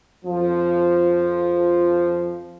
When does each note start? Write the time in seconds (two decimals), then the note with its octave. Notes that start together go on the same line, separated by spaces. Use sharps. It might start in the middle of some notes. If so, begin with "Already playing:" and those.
0.24 F2 F3